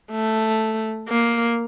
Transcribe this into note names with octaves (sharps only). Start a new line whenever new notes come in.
A3
A#3